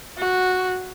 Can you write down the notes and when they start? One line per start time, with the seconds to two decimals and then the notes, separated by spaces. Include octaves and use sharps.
0.18 F#4